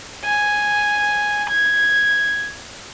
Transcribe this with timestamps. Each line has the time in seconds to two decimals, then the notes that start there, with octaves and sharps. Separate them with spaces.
0.25 G#5
1.50 G#6